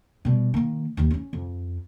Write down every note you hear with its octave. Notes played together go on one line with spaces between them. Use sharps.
B2 G3
D#3 A#3
D#2 D#3
C#4 E4
F2